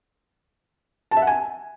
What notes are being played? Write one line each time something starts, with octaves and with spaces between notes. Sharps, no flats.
A5
E5
F#5
G#5